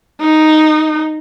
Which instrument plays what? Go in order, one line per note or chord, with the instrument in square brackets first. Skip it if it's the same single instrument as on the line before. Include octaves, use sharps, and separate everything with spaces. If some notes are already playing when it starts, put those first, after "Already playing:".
[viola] D#4